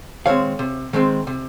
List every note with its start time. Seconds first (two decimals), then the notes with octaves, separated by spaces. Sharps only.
0.26 D#3 G#3 C4 C#5 F5
0.59 C3
0.93 D#3 G#3 C4
1.27 C3